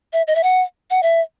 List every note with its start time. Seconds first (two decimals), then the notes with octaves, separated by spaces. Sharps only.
0.13 E5
0.27 D#5
0.35 E5
0.43 F#5
0.91 F#5
1.03 E5